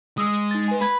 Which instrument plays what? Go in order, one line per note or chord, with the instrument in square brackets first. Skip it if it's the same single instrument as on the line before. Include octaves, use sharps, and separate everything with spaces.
[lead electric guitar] G#3 [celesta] D#6 E6
[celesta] D#4 A6
B4 G#5
[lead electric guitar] B4 [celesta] B5 G#6